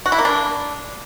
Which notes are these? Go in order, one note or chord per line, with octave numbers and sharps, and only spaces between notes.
F#4
E4
A#3
D4